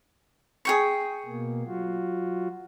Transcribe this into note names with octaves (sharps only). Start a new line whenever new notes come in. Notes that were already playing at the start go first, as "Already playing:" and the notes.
G#4 G5 C#6
B2 A#3
F#3 F4 F#4